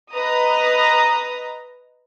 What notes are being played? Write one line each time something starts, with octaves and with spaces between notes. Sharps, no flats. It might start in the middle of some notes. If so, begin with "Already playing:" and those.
B4 D#5 A#5 D#6